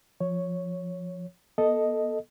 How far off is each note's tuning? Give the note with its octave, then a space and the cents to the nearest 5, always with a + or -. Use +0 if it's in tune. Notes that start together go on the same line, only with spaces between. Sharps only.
F3 +0 C#5 +0
B3 -35 A4 +0 D#5 +0